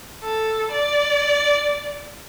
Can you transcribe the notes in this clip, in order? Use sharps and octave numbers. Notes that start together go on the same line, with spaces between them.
A4
D5